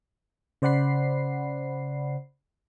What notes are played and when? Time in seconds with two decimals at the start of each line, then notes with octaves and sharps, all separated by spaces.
0.62 C#3 C5 D5 F#5 B5 C7